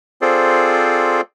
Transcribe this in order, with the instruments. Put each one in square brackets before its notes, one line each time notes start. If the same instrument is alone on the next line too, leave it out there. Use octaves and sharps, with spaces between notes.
[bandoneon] C4 F4 G#4 A4 C5 D5